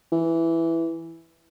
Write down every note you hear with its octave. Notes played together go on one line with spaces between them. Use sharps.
E3